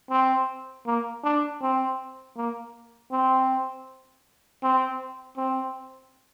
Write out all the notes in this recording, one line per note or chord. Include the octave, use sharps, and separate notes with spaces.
C4
A#3
D4
C4
A#3
C4
C4
C4